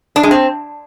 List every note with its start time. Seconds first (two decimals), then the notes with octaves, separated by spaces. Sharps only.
0.16 D4
0.23 G#3
0.31 C4